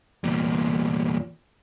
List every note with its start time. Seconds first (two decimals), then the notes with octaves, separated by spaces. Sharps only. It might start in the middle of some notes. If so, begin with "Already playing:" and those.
0.24 E2 A#2